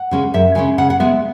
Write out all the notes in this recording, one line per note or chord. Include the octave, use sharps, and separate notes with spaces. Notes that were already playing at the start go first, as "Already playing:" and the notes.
Already playing: F#5
C#3 G#3 C#4
F#2 E5
C#3 G#3 C#4 G#5
C#3 F#5
F#5
G#3 B3 E5